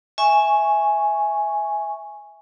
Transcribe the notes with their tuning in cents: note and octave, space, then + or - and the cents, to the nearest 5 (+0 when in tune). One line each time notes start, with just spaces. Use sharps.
E5 -5 G#5 +0 C#6 +0